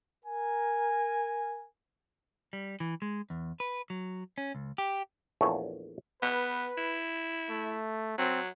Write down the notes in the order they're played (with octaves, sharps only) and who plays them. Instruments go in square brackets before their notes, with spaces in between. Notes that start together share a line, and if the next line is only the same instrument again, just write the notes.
[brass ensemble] A#4 G#5
[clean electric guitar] G3
E3
G#3
E2
B4
F#3
C#4
C#2
G4
[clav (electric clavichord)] A#1 E2 A3 C#5
[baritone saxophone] B3 [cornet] B4
[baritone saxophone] E4
[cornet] A3
[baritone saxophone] F#3 [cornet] C4